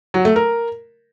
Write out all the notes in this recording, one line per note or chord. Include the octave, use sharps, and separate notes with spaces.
F#3
A3
A#4